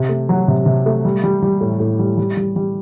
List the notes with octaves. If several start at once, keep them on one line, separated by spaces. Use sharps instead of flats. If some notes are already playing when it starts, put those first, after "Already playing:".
Already playing: C3
A3
F#3
C3
C3
A3
G3
G3
G3
A2
A2
G3
G3
G3
G3